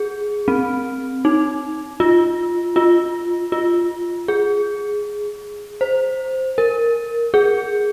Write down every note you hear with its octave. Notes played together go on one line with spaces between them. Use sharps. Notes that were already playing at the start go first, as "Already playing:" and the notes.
Already playing: G#4
C4
D#4
F4
F4
F4
G#4
C5
A#4
G#4